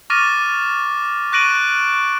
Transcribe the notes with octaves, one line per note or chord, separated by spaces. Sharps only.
C#6 D6 F6 A6 A#6 D#7
C#6 F#6 A#6 D7 D#7 F#7